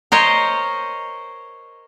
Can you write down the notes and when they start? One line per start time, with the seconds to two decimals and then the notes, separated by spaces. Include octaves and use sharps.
0.12 A#4 C5 C#5 D#5